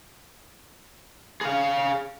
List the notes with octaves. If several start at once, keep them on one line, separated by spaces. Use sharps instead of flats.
G#4 F5